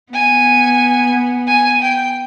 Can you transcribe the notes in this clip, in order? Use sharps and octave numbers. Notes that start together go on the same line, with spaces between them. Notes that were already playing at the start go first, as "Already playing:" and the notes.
B3 G#5
G#5
G5